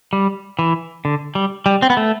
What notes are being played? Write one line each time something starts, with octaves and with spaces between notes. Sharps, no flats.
G3
E3
D3
G3
G3
C4
B3
A3